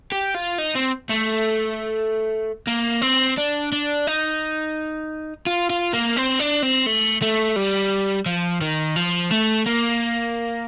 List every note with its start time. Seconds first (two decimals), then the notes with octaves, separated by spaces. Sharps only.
0.12 G4
0.34 F4
0.58 D#4
0.75 C4
1.10 A3
2.67 A#3
3.02 C4
3.37 D4
3.72 D4
4.07 D#4
5.47 F4
5.70 F4
5.93 A#3
6.17 C4
6.39 D4
6.63 C4
6.86 A3
7.22 A3
7.56 G3
8.26 F3
8.61 D#3
8.96 F3
9.31 A3
9.66 A#3